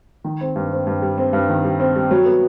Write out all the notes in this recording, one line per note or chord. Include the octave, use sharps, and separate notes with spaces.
D#3
C4
G2
C4
G2
G3
C4
G2
D#3
G3
C4
G3
F#3
B3